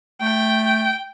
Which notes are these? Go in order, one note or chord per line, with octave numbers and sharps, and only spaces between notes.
A3 G5